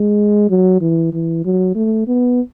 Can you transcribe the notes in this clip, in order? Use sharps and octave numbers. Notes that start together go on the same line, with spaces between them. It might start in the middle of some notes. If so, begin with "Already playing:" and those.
Already playing: G#3
F#3
E3
E3
F#3
A3
B3